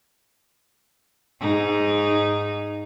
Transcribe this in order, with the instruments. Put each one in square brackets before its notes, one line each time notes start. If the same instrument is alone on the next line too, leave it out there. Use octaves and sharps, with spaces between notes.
[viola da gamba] G#2 D#4